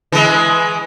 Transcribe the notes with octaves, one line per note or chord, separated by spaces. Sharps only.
E3 G#3